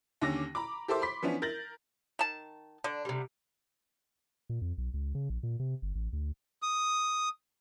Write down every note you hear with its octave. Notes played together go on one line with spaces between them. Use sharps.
D#2 D3 C#4 D6 A#6
A#5 B5 D6
G4 A4 A#4 C5 E5 D6
B5 C6 D6 B6
E3 F3 B3 C#4 D4
A#4 G6 A6 A#6 F#7
D#3 A5
D3 D4
C3 G3
A#2
F2
B1
C#2
C#3
A#1
A#2
C3
G1
A1
D2
D#6